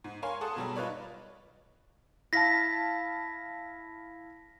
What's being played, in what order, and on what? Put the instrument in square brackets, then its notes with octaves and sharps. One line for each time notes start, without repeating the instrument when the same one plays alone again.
[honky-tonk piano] G#2
A#4 C#5 F5 G#5 C6
G#4 A4 F#5 A5 C6 D#6
B2 F#3 G3
D#4 F4 B4 C#5 D5
[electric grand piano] E4 F5 A5 [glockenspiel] A#6 B6